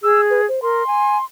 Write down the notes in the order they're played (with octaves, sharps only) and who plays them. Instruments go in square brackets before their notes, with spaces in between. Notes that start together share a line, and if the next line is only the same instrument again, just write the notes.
[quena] G#4 [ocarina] E6
[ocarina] B4
C5
[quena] A#4 [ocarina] C6
[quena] G#5